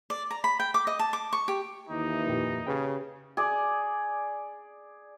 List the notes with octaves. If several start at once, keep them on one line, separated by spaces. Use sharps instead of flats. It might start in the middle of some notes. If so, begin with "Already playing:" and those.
D5
A#5
B5
G5
D6
D#5
A5
D6
C#6
G4
D#2 E3 D#4
F2 A#2 G4
C#3 G4 B4 G5
G#4 D5